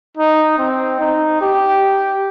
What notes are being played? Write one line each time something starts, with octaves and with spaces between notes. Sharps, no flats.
D#4
C4
D#4
G4